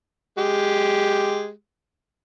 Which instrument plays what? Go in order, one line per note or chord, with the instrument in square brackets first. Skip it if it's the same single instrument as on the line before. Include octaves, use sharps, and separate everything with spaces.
[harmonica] G#3 G4